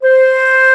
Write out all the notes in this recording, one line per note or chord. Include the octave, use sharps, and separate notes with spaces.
C5